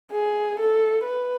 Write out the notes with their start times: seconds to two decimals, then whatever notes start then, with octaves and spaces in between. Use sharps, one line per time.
0.12 G#4
0.60 A4
1.05 B4